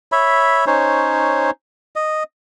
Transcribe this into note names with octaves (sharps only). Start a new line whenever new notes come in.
C#5 E5 B5
C#4 D#4 C5 C#5
D#5